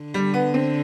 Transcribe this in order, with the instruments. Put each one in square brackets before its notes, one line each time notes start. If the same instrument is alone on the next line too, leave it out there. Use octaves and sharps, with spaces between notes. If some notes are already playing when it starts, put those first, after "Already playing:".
Already playing: [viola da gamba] D3
[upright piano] G3
B3
C4